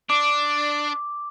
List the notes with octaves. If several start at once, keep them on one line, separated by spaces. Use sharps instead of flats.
D4 D6